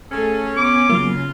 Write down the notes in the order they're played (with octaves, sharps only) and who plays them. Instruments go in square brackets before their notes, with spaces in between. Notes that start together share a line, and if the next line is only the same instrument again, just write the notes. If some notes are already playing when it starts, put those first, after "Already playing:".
[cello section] A3 G#4 A4 [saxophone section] C#4
[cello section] B3 C#5 [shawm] D6
[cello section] C#3 [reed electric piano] F#3 A#3 [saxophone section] F4